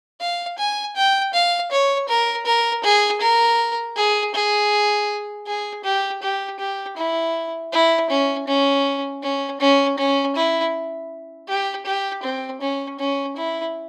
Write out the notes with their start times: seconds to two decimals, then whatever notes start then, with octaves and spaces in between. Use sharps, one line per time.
0.20 F5
0.59 G#5
0.96 G5
1.34 F5
1.71 C#5
2.09 A#4
2.46 A#4
2.84 G#4
3.22 A#4
3.97 G#4
4.35 G#4
5.47 G#4
5.84 G4
6.23 G4
6.60 G4
6.97 E4
7.73 E4
8.10 C#4
8.48 C#4
9.23 C#4
9.61 C#4
9.98 C#4
10.36 E4
11.48 G4
11.86 G4
12.23 C4
12.61 C#4
12.99 C#4
13.36 E4